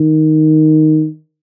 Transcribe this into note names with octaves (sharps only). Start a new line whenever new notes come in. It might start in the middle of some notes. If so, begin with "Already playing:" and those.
Already playing: D#3